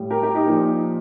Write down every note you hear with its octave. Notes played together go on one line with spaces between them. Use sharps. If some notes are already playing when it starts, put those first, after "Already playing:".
Already playing: A2 G3
G4 A#4
G4 A#4
D#4 G4
A#2 F3